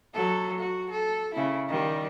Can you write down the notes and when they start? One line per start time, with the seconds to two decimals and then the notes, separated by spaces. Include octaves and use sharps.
0.14 F#3 A4
0.59 F#4
0.91 A4
1.34 C#3 E4
1.68 D#3 G3